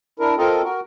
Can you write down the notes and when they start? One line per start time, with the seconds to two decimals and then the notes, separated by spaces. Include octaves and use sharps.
0.20 D4 E4 A#4
0.38 C4 F4 A4 A#4 D#5
0.64 F#4 A#4